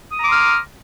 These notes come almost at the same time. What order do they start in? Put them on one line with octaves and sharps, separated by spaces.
D#6 A#5 D6 C6 F6